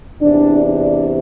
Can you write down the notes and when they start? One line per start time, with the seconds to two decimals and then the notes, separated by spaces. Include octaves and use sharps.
0.20 E2 C3 E3 D4
0.63 D4